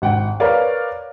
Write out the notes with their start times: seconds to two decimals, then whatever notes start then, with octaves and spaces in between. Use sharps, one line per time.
0.02 G#1 F#5 G5
0.40 A#4 B4 C#5 D5 F5